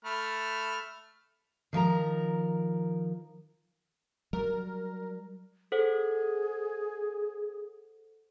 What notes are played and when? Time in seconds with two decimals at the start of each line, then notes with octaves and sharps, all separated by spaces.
0.05 A3 B5 F6
1.73 D#3 F3 A#4 A#5
4.33 F#3 G3 A#4
5.72 G#4 A4 C5 F#5